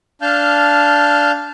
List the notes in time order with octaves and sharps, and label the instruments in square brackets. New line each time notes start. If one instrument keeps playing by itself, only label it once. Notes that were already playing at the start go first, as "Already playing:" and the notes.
[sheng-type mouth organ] D4 F5 A5 F6 G6